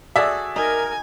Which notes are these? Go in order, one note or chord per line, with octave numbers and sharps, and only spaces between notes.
F#4 G#4 A4 D5 E5
D#4 A#4 G#5